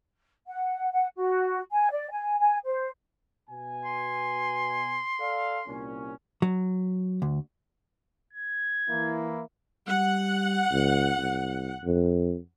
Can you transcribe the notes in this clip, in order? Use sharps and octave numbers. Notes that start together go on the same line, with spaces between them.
F#5
F#5
F#4
G#5
D5
G#5
G#5
C5
B2 G#5
C6
A4 D5 F5
C2 A#2 C#4
F#3
D2
G#6
E3 A#3 E4
G3 F#5
C#2
C2
F2